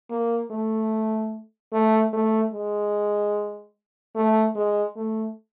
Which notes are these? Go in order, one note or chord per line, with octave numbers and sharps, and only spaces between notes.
A#3
A3
A3
A3
G#3
A3
G#3
A3